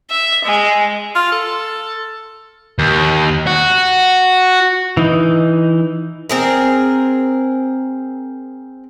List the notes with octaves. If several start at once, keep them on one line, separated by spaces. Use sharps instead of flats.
E5
G#3
F4
A4
D#2
F#4
E3 D#4
C4 G#4 A#4